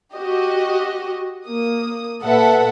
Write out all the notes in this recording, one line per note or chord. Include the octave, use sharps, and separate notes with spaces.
F#4 G4 D#5
A#3 D#6
A#2 A4 B4 E5 F#5